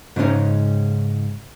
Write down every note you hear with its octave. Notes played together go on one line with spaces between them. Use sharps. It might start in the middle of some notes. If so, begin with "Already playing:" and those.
G#2 C#3 G#3 A3 C#4 D#4